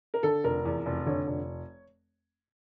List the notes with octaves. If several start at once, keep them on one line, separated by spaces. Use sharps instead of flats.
A#4
D3 A4
F1 A#4
E2
F1
D3 C#5
F1